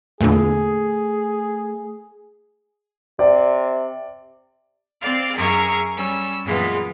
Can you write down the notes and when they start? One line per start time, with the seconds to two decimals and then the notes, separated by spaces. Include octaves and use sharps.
0.21 E2 A#2 D3 A3 G#4
3.19 C3 D5
5.01 C4 C5 D5 F5
5.36 F#2 G#4 A#4 E5 A#5 C#6
5.96 G3 C#4 E6
6.45 F#2 A#2 E3 G#3 B3 F4